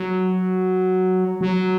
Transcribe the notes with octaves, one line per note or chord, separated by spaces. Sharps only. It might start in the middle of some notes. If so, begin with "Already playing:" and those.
Already playing: F#3
F#3